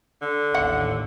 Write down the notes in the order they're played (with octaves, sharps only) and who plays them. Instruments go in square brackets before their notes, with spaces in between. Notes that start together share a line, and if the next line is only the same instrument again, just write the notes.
[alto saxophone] D3
[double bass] A1 D#2 [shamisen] F#5